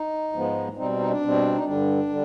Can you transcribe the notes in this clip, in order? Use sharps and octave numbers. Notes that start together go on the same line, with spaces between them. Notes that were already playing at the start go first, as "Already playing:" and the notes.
Already playing: D#4
G#2 F3 G#3 B3
B2 G3 C4 D#4
D#4
D4
B2 G3 C4
D#4
G2 D3 G3 D4
D3 G3